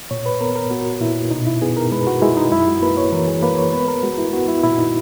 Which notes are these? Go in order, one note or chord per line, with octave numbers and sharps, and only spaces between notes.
A#2 C#5
B4
B3 A#4
A#4
B3 F#4
A#2 E4
B2 D#4
E4
B3 G#4
A#4
G#3 B4
F#4
G#3 E4
D#4
F#2 E4
F#4
A#3 B4
C#5
E3 A#4
G#4
A#3 B4
C#5
B3 B4
A#4
G#3 F#4
E4
B3 F#4
E4
A#2 E4
D#4